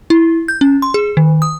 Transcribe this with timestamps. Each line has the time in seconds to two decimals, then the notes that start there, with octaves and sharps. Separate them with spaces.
0.10 E4
0.48 G6
0.61 C#4
0.82 C6
0.94 G#4
1.17 D#3
1.42 D#6